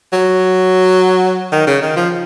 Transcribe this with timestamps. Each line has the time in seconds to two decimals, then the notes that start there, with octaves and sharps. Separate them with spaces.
0.13 F#3
1.52 D#3
1.67 C#3
1.82 D#3
1.96 F3